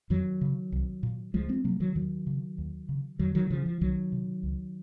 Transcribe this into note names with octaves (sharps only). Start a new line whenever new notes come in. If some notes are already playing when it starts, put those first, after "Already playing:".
F2 D#3 F#3
C#3
C2
A#2
C#2 F3 G#3
G#3 C4
C3 F#3 A#3
D#3 F#3
D#2 D#3 F#3
C#3
D#2
C#3
F2 D#3 F#3
D#3 F#3
C#3 F3
F3
C2 D#3 F#3
C3
C#2